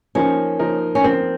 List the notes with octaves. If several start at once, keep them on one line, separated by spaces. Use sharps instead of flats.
F3 A#3 C#4 D#4 A#4
F3 A#3 D#4 A#4
C#4
F3 A#3 C4 D#4 A#4